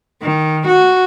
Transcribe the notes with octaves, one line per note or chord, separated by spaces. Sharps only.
D#3
F#4